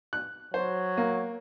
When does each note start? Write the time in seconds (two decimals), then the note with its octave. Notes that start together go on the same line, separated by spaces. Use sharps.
0.13 F#6
0.54 F#3 C5
0.97 A#3